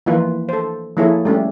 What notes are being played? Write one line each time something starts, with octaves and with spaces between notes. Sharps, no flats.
E3 F3 A#3 F4 B4
A4 C5
F3 A#3 E4 G#4 A4 C#5
G3 A3 C#4 G4